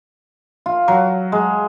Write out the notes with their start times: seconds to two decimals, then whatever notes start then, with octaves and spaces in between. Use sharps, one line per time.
0.66 F4
0.88 F#3
1.32 G#3